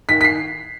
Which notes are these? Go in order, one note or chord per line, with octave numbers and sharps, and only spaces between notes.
D#3 B6
B6
C7